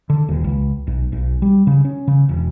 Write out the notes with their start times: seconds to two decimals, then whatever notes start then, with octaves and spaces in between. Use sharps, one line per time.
0.10 D3
0.28 D#1
0.44 C#2
0.87 B1
1.12 B1
1.42 G3
1.67 C#3
1.85 C#4
2.07 C#3
2.29 E1